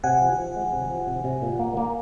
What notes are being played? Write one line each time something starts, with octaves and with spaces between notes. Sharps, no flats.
C3 F#5 G#5
F3
F3
G#3
C3
F3
C3
C3
A#2
A#3
A#3